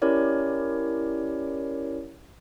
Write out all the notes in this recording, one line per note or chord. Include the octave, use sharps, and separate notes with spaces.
C#4 E4 G4 A#4 C#5 D5